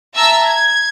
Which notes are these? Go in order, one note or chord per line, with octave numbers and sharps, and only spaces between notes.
E5 A5 A#5 E6
G#6